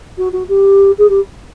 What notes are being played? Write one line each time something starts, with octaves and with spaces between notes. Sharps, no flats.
F#4
F#4
G4
G#4
G4